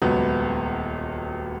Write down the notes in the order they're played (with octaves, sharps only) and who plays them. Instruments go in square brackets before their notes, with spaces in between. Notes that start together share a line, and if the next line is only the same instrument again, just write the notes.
[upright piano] D#1 C#2 F#3 B3